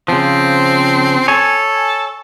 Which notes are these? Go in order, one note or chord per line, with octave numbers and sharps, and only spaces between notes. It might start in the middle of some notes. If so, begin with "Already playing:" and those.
C#3 F3 C4
A4 C#5 G#5